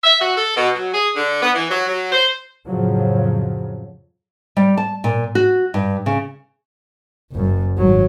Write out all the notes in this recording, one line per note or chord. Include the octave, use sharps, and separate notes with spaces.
E5
F#4
A4
B2
F#3
G#4
D3
B3
E3
F#3
F#3
C5
F2 A2 C#3 F3 F#3
G3
A5
A#2
F#4
G2
C#3
F#1 F#2
G#1 F#3